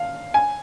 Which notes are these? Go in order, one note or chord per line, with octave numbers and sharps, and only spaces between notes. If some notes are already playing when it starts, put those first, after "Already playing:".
Already playing: F5
G#5